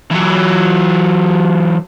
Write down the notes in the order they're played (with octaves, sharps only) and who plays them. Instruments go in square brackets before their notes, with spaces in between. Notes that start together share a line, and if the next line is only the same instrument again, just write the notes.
[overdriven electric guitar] E3 F#3